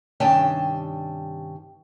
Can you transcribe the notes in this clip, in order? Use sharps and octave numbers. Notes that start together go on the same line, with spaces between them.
G2 C3 D#3 C#4 G5 A5